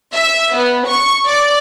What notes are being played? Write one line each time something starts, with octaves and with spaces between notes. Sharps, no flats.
E5
B3
C#6
D5